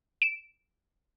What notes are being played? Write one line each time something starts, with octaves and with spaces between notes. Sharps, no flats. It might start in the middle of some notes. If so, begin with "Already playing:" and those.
D7 E7